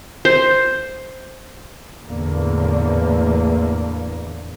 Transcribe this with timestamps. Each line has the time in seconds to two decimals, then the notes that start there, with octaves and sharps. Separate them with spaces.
0.25 C5
2.05 E2 A2 D3 A#3